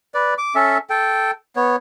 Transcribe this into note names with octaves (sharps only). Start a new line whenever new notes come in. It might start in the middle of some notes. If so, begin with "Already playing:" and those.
B4 D5
D6
C#4 A4 E5
A4 G5
B3 C#5